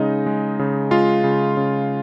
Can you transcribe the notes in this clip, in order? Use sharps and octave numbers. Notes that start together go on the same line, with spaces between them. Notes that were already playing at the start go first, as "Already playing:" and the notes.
Already playing: C#3 G#3 D#4 D#5
G#3
C#3
G#3 F4 F5
C#3
C#3